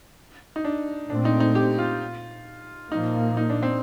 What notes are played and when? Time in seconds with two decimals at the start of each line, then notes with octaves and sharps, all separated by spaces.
0.56 D#4
0.65 D4
1.09 A#2 A3 C4 D4
1.25 D#4
1.40 D#4
1.55 G4
1.78 F4
2.92 A#2 F3 A#3 D#4
3.37 D#4
3.50 D4
3.63 C4